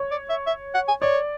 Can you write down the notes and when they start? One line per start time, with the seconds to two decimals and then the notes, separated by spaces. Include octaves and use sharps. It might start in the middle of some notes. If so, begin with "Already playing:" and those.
Already playing: C#5
0.11 D5
0.30 E5
0.47 E5
0.75 F#5
0.88 G#5
1.02 C#5 D5